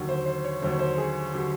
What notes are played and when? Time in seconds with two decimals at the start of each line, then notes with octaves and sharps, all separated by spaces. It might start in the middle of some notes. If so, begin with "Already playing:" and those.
Already playing: D#2 D3 F#3
0.09 C5
0.26 C5
0.45 C#5
0.62 D#2 D3 F#3 C5
0.70 C#5
0.79 C5
0.98 G#4
1.33 D3 F#3 G4